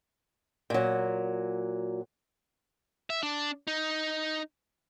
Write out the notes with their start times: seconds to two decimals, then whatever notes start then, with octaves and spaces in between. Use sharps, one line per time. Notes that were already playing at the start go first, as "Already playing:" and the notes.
0.70 A#2 F#3
3.10 E5
3.23 D4
3.67 D#4